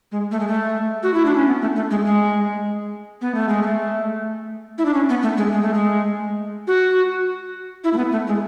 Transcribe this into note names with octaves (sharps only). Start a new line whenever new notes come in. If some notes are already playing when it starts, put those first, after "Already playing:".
G#3
A3
G#3
A3
F#4
E4
D4
C#4
B3
A3
A3
G#3
G#3
B3
A3
G#3
A3
E4
D4
C#4
B3
A3
G#3
G#3
A3
G#3
F#4
E4
A3
B3
A3
G#3